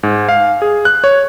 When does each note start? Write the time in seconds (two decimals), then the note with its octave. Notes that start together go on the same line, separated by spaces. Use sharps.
0.03 G#2
0.29 F5
0.62 G#4
0.85 F#6
1.04 C#5